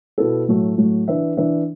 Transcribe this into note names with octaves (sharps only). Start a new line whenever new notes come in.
B2 B3 E4 A4
A2 F#3 A3 F#4
A2 F#3 A3 F#4
E3 D4 B4 E5
E3 D4 B4 E5